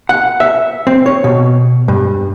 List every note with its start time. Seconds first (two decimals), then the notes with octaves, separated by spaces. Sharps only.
0.09 F#5
0.40 E5
0.87 C4
1.06 C#5
1.24 B2
1.88 G2